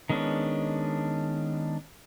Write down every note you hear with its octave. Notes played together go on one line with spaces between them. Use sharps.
D#3 G#3 B3 C#4 D4